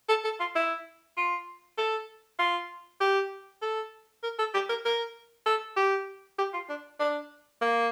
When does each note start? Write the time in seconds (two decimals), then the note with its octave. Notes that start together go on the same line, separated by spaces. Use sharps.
0.09 A4
0.24 A4
0.40 F4
0.55 E4
1.17 F4
1.78 A4
2.39 F4
3.01 G4
3.62 A4
4.24 A#4
4.39 A4
4.54 G4
4.69 A#4
4.85 A#4
5.46 A4
5.76 G4
6.38 G4
6.53 F4
6.69 D4
7.00 D4
7.61 A#3